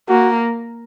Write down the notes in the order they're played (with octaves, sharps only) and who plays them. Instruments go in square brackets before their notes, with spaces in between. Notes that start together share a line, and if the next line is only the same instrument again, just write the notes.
[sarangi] A#3 [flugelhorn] F#4